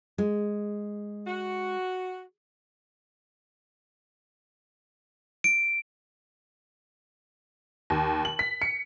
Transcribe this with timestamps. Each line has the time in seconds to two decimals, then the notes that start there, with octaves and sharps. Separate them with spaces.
0.18 G#3
1.26 F#4
5.44 D7
7.90 D#2
8.25 F#7
8.39 B6
8.62 C#7